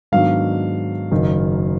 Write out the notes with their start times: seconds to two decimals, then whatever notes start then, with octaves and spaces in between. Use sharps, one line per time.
0.12 G#2 D#3 F#3 B3 D4 F5
1.11 F#1 F#2 D#3